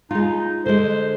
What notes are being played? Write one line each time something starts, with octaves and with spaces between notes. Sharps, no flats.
G#3 D#4 F4
D3 G#3 C5